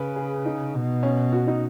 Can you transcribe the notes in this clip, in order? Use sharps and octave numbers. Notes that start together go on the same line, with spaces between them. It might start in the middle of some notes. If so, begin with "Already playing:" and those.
Already playing: C#3 B4
G#4
D#4
B2
C#4
F#4
D#4